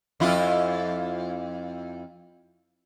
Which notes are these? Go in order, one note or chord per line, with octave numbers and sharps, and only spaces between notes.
F2 E4 F4